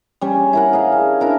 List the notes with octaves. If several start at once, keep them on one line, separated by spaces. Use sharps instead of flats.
G3 C#4
E4 A#4 F#5
G#4 D#5 F5
A5
D4 E4 A#4 A5